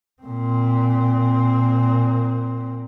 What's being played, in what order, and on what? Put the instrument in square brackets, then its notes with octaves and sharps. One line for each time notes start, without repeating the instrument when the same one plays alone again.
[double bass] A#2 C4